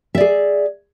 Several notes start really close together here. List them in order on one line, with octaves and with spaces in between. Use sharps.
E5 D5 G#4